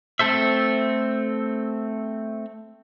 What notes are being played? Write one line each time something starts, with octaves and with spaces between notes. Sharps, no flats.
A3 C4 A4 C5 E5